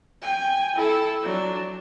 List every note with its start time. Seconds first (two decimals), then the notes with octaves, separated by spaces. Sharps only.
0.22 G5 G#5
0.76 E4 A4
1.22 F#3 D4